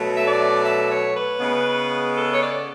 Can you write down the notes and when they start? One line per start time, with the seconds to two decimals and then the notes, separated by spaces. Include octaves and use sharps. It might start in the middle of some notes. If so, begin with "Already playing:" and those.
Already playing: B2 F#3 A3
0.16 E5
0.26 D5
0.64 E5
0.90 C#5
1.15 B4
1.40 C#3 G#3 B3
2.15 A4
2.33 C#5
2.40 D5